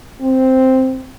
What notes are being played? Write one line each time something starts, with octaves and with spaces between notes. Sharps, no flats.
C4